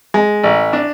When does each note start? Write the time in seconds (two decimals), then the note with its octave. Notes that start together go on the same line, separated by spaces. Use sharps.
0.14 G#3
0.43 A1
0.73 D4